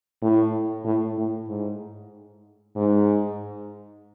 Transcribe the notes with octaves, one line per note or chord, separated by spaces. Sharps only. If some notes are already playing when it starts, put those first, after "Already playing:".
A2
A2
A2
G#2
G#2